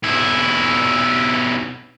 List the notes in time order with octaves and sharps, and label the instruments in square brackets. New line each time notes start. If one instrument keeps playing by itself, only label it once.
[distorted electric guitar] B1 E4